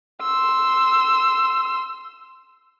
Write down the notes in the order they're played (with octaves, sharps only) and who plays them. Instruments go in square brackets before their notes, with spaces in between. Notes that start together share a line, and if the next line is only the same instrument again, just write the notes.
[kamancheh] C6 E6